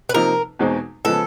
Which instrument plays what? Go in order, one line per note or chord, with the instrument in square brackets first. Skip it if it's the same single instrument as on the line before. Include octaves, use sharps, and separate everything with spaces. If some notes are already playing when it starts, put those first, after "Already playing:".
[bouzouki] B4
[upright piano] C3 F3 A#3 D#4 [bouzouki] A#4
[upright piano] E2 B2 G#3 C4 D#4
[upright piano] C#3 F3 G#3 B3 [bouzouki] A4